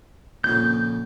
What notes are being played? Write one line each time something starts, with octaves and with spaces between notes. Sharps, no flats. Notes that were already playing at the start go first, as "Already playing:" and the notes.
A#1 F2 C#3 G6